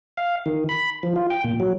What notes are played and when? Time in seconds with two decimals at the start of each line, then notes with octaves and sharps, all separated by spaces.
0.17 F5
0.46 D#3
0.69 B5
1.03 F3
1.16 F4
1.30 G5
1.44 A#2
1.60 F#3